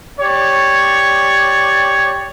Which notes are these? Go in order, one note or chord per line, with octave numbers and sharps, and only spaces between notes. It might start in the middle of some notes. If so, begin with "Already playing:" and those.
G4 C#5 D5